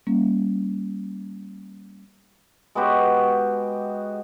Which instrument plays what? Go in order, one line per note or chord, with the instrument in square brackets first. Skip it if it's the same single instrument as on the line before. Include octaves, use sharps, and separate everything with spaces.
[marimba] G3 A#3 C#4
[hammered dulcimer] G#3 B3 F#4 G4